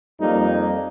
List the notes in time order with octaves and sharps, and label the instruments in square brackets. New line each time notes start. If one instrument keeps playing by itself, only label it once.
[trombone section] F2 G3 A#3 D#4